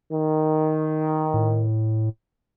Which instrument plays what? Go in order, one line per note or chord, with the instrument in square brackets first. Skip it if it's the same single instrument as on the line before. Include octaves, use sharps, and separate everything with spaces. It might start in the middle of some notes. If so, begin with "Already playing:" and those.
[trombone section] D#3
[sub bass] A2